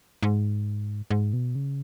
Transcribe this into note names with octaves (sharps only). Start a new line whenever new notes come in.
G#2
G#2
B2
C#3